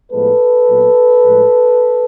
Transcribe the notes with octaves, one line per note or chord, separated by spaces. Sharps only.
A2 F3 G#3 B3 A4 B4
A#2 F#3 B3
A2 F3 G#3